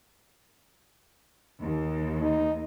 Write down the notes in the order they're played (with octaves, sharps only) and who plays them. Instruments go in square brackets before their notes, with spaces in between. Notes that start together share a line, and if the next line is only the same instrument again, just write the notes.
[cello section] D#2
[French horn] D#4